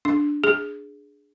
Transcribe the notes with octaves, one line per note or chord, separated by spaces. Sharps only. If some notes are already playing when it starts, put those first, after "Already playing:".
D4
G#4